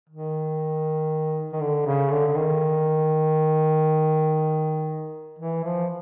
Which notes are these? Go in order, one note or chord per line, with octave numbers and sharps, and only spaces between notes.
D#3
D#3
D3
C#3
D3
D#3
E3
F3